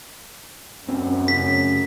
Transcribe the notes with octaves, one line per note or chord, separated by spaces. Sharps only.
D#1 F#2 C4 C#4
F1 C#3 B6